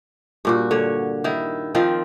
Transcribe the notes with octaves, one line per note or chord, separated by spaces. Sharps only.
G2 A#2 F#4
D3 C#5
D#3 E4
D#3 F3 C4 F4